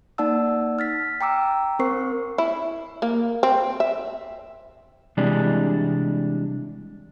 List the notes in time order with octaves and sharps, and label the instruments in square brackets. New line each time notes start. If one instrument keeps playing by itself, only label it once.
[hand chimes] A#3 D#4 D5 F#5 A5 E6
F6 A6 B6
G5 A#5 D6 E6
C4 A#4 C5 C#6 C7
[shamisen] E4
A#3
C4
E5
[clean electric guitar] C3 E3 G3 G#3 D4